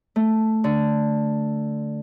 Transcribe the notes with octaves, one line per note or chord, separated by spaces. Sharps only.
A3
D3